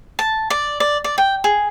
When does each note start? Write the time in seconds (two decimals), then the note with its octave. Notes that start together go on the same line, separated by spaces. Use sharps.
0.19 A5
0.50 D5
0.80 D5
1.04 D5
1.18 G5
1.44 G#4